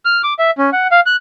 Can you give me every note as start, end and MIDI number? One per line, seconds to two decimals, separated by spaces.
0.05 0.22 89
0.24 0.34 86
0.39 0.51 76
0.58 0.70 61
0.73 0.87 78
0.91 1.00 77
1.06 1.16 90